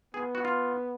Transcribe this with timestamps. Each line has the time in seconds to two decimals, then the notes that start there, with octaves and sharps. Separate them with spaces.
0.14 B3 G#4
0.35 F#4
0.45 F4